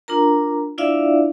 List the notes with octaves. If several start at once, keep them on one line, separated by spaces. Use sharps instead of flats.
D4 F4 A#4 A#5
D4 E4 F4 D5 E5 F5